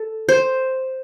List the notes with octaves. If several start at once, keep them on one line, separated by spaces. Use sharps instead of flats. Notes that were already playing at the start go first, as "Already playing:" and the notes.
Already playing: A4
C5